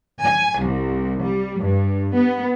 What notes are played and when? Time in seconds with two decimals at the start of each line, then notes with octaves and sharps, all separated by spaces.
0.23 G#5
0.62 C2
1.21 G3
1.59 G2
2.13 B3